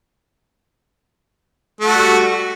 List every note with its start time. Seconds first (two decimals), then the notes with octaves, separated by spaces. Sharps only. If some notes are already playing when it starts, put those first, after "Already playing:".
1.80 A3
1.85 F#4
1.89 G3